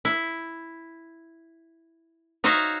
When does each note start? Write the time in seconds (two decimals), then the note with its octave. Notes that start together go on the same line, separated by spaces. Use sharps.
0.05 E4
2.44 D#4 F#4 C5 C#5 E5 F5